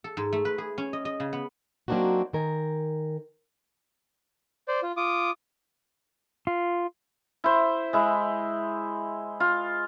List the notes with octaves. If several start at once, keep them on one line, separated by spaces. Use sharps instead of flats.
A4
G#2
A3
B4
G#4
C#4
D#5
D#5
C#3
B3
F#3 A#3 C4 D4 D#4 F#4
D#3 A#4 G#5
C5 D5
F4
F4 D6 D#6
F4
E4 C5
G#3 E4
F4